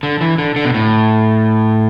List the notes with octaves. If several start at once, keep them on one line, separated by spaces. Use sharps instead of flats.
D3
E3
D3
D3
B2
A2